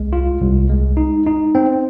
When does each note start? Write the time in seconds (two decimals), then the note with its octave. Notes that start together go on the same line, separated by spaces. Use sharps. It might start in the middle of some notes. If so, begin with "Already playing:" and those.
Already playing: C2 G#3
0.13 F4
0.41 C2
0.70 G#3
0.97 D#4
1.26 D#4
1.55 C4